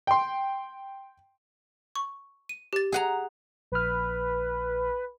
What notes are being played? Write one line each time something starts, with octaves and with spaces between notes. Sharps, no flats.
G5 C6
C#6
D#7
G4 A6
G#4 F#5 A#5
A#1 B4 F6